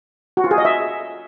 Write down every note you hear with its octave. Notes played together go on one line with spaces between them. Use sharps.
F#4
F4
G#4
D#5
E5